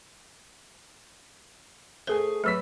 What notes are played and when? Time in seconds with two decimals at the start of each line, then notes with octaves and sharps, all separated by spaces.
2.07 A3 G#4 A#4 C5 G#5
2.44 F#3 A3 B4 E6 B6